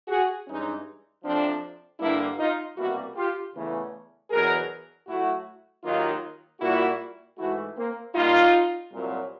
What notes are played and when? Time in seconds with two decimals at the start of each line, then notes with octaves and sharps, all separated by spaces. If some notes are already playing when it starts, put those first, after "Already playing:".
0.08 F#4 G#4
0.46 G2 E3 G#3 C#4 D#4
1.24 F2 C3 F3 C4 D4
2.00 G2 D3 G3 A#3 D4 E4
2.38 D#4 F4
2.76 C2 B2 G3 A#3 E4 F#4
3.16 F4 G4
3.54 E2 C#3 E3 A3
4.30 E2 B2 F#3 G#4 A#4
5.07 A2 F#3 A3 E4 F#4
5.84 D#2 D#3 F#3 A#3 D#4 F4
6.60 A#2 G3 A#3 E4 F#4
7.38 G#2 E3 A3 E4 F#4
7.76 A#3 C4
8.14 A#2 G3 A#3 D#4 F4
8.91 C2 A#2 F#3